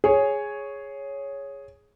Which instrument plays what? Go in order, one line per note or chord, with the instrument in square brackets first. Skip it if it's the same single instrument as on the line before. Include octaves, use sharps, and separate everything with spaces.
[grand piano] G#4 C#5